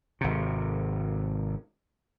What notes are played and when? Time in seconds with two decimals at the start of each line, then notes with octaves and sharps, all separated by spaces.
0.21 G#1 C3